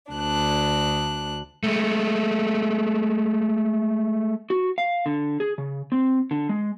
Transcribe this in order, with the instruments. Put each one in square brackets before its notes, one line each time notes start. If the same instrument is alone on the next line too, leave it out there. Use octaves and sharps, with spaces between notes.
[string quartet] D2 D4 F#6
[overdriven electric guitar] G#3 A3
[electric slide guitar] F#4
F5
D3
G#4
C#3
C4
D3
G#3